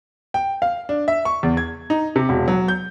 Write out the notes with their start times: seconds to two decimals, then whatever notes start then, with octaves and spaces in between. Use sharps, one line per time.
0.34 G5
0.62 F5
0.89 D4
1.08 E5
1.25 C#6
1.43 E2
1.57 G#6
1.90 D#4
2.16 C3
2.29 E1
2.48 F#3
2.68 G6